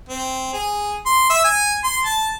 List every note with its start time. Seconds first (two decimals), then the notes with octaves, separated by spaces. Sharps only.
0.09 C4
0.53 G#4
1.06 C6
1.30 E5
1.45 G#5
1.84 C6
2.05 A5